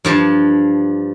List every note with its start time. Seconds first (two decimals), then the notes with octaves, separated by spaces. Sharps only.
0.05 G2 F3 A5